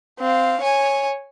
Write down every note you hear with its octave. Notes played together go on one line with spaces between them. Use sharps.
C4 F5
C#5 G#5